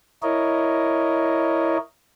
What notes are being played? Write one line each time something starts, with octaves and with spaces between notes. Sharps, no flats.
E4 A#4 C#5 D#5